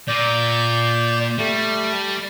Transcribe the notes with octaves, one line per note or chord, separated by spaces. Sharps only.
A#2 D5 G6
G3 A3